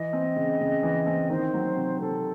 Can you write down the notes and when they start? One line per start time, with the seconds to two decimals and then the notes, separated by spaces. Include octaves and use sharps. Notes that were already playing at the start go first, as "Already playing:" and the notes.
Already playing: E3 D#5
0.13 C4
0.36 C#3
0.61 C#3
0.83 E3
1.07 C4
1.30 D#3 C5
1.54 F#3
1.76 C3
2.00 C3 A4